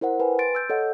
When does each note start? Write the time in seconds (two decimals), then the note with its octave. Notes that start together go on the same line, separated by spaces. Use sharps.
0.01 E4 A#4 C5 F#5
0.20 B4 G5 G#5
0.39 C6 A6 D7
0.55 E6 G6
0.70 A4 C#5 D#5 F#5